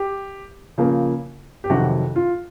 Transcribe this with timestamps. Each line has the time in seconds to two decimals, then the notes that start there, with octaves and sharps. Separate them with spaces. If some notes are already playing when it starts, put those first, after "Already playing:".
Already playing: G4
0.78 C#3 F3 A#3
1.64 G4
1.70 F2 C3 D#3 F#3 F#4
2.16 F4